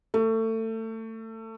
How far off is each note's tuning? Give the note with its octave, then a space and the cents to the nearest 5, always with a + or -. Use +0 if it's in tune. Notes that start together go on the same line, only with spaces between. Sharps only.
A3 +25